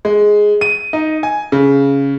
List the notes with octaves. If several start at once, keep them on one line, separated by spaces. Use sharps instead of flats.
G#3
D#7
D#4
G#5
C#3